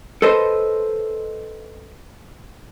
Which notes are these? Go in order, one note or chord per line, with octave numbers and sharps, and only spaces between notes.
A4 B4 C5 D#5